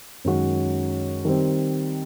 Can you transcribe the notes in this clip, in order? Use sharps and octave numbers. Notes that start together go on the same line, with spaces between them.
F#2 D#3 G#3 C#4 F#4
D#3 G3 C4